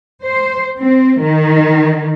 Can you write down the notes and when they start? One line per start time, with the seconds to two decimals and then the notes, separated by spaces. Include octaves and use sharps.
0.24 C5
0.78 C4
1.20 D#3